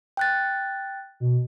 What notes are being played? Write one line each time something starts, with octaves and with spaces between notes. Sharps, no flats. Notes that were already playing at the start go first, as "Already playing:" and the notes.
G5 F#6 A6
B2